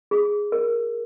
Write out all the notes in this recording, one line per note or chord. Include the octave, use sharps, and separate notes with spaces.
G#4
A#4